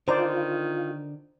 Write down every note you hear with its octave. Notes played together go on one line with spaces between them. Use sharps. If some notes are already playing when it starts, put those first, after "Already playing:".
D3 D#3 F4 C5 D5 A#5